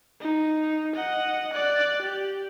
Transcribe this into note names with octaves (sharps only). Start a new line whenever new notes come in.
D#4
D#5 F#5
D5 F#6
G4